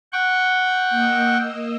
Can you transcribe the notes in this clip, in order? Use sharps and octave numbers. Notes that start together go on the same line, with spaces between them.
F#5 G5 C#6
A#3 D#5 E6